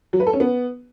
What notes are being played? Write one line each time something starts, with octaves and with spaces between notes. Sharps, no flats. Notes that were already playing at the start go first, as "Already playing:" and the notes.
F#3
B4
A4
C#4
B3